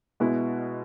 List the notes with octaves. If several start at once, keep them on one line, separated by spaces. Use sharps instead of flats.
B2 G#3 B3 E4